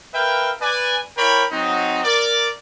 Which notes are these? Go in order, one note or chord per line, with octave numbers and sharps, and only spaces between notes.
A#4 B4 E5 F5 G5
B4 D5 G#5
E4 A#4 C#5 D5 G5 B5
F#3 C4 D#4
A#4 D5